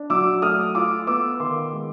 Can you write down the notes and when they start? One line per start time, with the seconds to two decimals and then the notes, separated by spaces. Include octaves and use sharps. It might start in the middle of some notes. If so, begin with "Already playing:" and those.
Already playing: D4
0.10 F#3 D6 E6
0.42 A3 D#6 F6
0.75 F4 D6 E6
1.07 B3 D6 E6
1.40 D#3 C6 D6
1.72 G#3